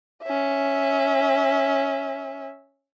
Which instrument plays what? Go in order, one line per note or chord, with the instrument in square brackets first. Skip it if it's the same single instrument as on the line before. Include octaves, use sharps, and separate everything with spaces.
[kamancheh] C#4 E5